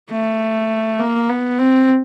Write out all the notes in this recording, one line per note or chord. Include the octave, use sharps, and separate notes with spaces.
A3
A#3
B3
C4